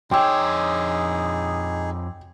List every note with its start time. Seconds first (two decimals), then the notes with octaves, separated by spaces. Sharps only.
0.11 F2 D#4 G#4 C#5 G5 C6 D6 E6